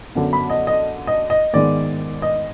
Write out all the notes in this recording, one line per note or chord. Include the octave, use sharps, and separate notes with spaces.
F#2 D3 F#3 B3
B5
D#5
D#5
D#5
D#5
G#2 D#3 G#3 B3 D5
D#5